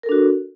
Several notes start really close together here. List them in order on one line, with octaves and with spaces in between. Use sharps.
A#4 A4 D4 F#4